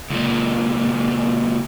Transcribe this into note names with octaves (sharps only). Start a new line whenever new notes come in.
C#2 A#2